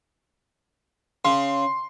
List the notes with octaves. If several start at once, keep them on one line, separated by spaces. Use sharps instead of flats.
C#3 C6